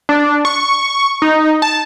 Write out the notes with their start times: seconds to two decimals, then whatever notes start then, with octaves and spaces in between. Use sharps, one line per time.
0.09 D4
0.45 C#6
1.22 D#4
1.62 A5